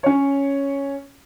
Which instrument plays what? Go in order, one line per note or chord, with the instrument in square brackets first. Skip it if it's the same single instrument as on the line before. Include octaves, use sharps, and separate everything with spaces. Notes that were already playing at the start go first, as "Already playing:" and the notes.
[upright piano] C#4 C#5